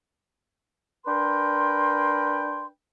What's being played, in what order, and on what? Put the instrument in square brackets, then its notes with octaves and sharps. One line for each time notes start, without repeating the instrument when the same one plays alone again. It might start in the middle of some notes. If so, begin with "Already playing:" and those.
[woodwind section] D4 A#4 B4 G5 C6